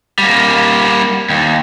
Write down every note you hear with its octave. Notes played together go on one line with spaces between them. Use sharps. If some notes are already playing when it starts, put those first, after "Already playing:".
G3 A#3
D#2